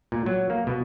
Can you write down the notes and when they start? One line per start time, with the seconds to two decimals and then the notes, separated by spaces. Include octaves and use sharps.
0.12 A#2
0.26 F#3
0.50 A#3
0.67 B2